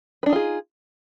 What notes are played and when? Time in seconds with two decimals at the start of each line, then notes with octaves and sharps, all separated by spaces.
0.23 B4
0.26 D4
0.29 D#4
0.33 F4
0.36 G#4